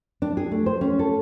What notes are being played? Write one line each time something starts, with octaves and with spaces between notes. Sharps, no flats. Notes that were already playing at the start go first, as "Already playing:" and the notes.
D4
G#4
A3
C5
C#4
A4